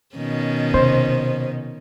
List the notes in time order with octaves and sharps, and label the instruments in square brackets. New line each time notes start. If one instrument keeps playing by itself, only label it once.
[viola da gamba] B2 D#3 C#4
[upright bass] C3 [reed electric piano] C5